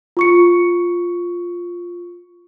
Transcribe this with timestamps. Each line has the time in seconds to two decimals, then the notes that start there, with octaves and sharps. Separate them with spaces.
0.17 F4 C#6 C#7